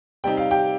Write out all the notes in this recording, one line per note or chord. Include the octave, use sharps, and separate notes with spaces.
C3 G3 C4 D#4 G5
F5
G4 G5